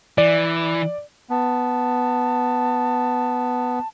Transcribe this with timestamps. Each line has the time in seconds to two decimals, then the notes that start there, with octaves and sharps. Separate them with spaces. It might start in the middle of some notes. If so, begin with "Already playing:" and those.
0.18 E3 D5
1.30 B3 A5